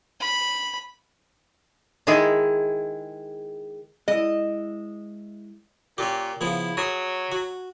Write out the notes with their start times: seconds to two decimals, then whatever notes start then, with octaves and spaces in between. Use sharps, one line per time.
0.20 B5
2.07 D#3 G#3 E4 G#4
4.08 G#3 E4 D#5
5.98 A#2 C#4 G4
6.41 C#3 F3 B3 E4
6.77 F#3 G#4 C#5
7.32 F#4